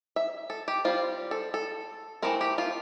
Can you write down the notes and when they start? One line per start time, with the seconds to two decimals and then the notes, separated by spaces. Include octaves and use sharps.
0.16 E5
0.50 A4
0.68 G4
0.85 G3 C4 F4
1.31 A4
1.54 A4
2.22 E3 A3 C4 A#4
2.41 G4
2.58 F4